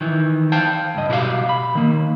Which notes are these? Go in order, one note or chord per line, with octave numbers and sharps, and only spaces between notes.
D#3 E3
C5 F5 G5 A5
C#2 G2 D#5
B2 E4 F#4 G4 F5
B5
D#3 A#3